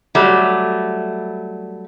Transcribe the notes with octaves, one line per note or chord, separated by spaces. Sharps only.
F#3 G3 A3